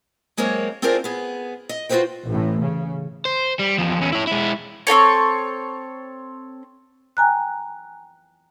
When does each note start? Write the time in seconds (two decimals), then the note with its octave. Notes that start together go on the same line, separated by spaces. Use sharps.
0.37 F#3 G#3 A#3 C4 A#4 C#5
0.82 C4 D4 F4 G#4 A#4 C5
1.04 B3 G#4
1.69 D#5
1.89 F4 F#4 G#4 B4 C5 G5
2.25 A1 A2
2.60 C#3
3.25 C5
3.59 G3
3.78 E2 F3
3.99 E2 C#4
4.13 E4 C#5
4.27 G#3 E4
4.87 C4 E4 A4 C#5
7.17 G5 G#5 A#5 F#6